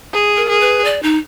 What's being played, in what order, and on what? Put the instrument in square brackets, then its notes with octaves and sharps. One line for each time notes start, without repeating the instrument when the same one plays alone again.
[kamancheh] G#4
[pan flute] A#4
[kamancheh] G#4
[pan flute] B4
D5
D#4